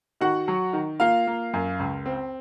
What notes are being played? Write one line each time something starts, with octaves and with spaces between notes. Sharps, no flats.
D#3 F#4 F#5
F#3
D#3
A#3 F4 F5
A#3
F#2
C#2
C4